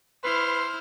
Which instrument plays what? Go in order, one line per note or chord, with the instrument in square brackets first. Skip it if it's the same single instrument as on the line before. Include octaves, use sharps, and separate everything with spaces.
[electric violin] E4 C5 [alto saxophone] B4 [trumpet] C6 [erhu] F6